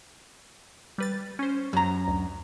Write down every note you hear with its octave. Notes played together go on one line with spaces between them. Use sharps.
G3 B4 A6
C#4 C5
F#2 A#5
D2